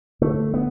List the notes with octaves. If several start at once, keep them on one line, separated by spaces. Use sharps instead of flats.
D3 A3
B3